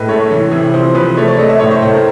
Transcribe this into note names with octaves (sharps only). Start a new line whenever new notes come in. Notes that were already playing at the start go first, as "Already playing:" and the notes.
Already playing: A2 G#3 B4
A3 C#5
E3
C3
F3 C5
F3 B4
A3 C#5
D5
A3 D#5
E5
A2 C#5
C5
A2 C5
A#4